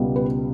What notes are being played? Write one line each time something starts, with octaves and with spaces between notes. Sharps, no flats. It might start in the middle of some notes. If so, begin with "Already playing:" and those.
Already playing: C#2 B2 G3 B3
B4